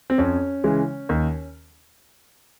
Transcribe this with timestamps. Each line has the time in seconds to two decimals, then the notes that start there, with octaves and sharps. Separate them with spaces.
0.10 C4
0.18 F2 C#4
0.64 C#3 E3 G#3
1.09 D#2